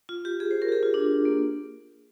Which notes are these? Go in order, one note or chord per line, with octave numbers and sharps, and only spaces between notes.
F4
G4
G#4
C5
A#4
G4
G#4
F4
D4
A#3